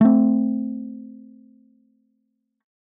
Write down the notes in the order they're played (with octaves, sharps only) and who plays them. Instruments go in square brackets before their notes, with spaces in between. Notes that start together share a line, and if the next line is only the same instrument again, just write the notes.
[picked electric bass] A3 C4